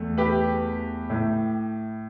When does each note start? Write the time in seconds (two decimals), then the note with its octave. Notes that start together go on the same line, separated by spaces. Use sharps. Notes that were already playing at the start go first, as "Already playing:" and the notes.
Already playing: E2 A3
0.18 G4 B4
1.10 A2